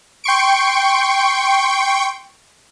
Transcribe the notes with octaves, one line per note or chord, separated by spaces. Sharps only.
G5 C6 C#6 D7